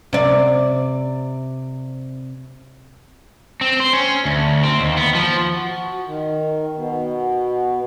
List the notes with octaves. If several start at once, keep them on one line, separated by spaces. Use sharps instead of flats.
C3 D5
C4
C5
C#4
D2
C4
D#2
B3
F3
F#4
D#3
B2